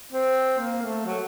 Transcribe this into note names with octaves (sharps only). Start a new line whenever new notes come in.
C4
A#3
A3
F#3